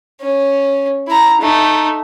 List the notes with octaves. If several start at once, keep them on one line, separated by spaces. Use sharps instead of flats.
C#4
E4 A#5
A3 D#4